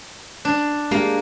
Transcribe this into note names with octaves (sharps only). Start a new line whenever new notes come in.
D4
G#3 A#3 D4 G4